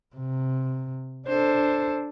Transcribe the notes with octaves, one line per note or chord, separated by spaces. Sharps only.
C3
D4 A4 C5